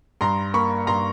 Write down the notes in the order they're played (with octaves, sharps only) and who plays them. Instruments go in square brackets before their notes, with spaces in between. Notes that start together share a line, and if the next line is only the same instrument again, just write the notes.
[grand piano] G2 A#5 C6
A#3 B5 C#6
G2 A#5 C6